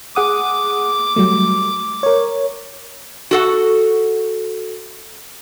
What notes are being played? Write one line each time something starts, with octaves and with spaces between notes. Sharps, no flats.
G#4 F#5 D6 D#6
F#3 G3 A3
A#4 C#5
F#4 A4 F#5